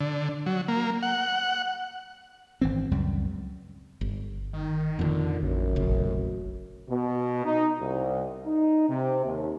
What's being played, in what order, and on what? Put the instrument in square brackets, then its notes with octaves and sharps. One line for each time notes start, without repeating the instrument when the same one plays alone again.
[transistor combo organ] D3
F#3
A#3
F#5
[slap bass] G#1 E3 C4
C#2 F#2 G3
[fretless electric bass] G1
[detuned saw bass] D#3
[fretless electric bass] F2 D#3 [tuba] A#2 [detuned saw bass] D3
[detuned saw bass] A1 [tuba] F#2
[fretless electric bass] F1 A#1 C#3
[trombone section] B2
D#4
C2
D#4
C3
D#2